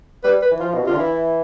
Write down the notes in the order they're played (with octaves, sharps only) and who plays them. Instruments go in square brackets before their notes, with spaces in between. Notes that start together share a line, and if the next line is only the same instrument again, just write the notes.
[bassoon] G3 [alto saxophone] B4
[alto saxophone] B4
[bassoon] E3
[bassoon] F3 [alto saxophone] F4
[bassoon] B2
C3
[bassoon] D3 [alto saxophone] F4
[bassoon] E3 [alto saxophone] E4